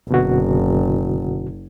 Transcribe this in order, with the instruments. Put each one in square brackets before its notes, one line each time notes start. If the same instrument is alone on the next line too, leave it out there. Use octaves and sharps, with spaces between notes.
[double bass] F#1 [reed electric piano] B2 D3 F#4